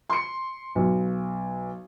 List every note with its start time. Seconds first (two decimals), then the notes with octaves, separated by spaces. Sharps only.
0.09 C6 C#7
0.75 B1